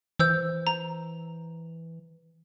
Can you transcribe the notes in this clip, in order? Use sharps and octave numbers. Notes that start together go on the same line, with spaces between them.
E3 C5 E6 G6
A#5